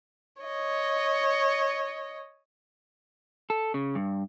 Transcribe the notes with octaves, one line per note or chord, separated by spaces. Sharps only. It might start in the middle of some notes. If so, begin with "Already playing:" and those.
C#5 D#5
A4
C#3
G2